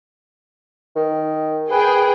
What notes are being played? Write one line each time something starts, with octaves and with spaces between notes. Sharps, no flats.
D#3
G#4 B4 G5